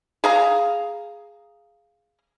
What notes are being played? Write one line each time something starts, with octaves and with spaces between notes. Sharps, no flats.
G#4 F5 A#5